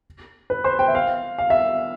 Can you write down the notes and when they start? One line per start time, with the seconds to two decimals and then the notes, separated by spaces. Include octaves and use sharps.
0.50 B4
0.64 C5
0.79 G5
0.88 E5
0.95 F5
1.38 F5
1.50 E5